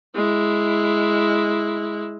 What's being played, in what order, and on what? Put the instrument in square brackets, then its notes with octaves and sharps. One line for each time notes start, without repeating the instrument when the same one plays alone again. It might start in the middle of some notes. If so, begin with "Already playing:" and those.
[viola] G#3 E4